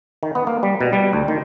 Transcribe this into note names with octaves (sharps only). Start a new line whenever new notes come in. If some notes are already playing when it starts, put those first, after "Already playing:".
D#3
B3
A#3
G3
B2
G3
D2
D#3